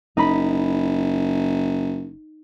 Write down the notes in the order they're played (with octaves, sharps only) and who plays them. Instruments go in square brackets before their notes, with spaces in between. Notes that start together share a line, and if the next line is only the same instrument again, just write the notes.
[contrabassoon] F#1 [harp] D#4 B5